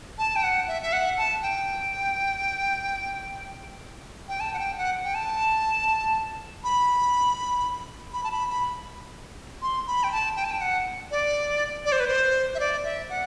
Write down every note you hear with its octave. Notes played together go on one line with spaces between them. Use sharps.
A5
G5
F#5
E5
E5
F#5
A5
G5
G5
A5
F#5
G5
F#5
G5
A5
B5
B5
A5
B5
B5
C6
B5
G5
A5
G5
A5
G5
F#5
D5
D5
C5
B4
C5
E5
D5
E5
F#5